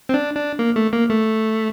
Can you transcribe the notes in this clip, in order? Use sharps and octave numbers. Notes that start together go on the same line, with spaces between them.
C4
D4
D4
A#3
A3
A#3
A3